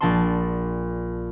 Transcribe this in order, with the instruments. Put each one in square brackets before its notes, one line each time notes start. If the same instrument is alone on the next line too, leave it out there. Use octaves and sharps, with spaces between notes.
[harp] A#1 D5 A5 C6